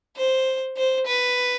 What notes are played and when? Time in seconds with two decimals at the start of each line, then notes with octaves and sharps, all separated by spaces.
0.17 C5
0.77 C5
1.07 B4